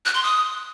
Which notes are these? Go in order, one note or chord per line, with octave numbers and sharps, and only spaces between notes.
F#6
C6
D#6